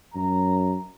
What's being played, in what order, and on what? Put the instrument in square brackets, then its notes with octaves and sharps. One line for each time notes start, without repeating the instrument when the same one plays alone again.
[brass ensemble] F#2 A#5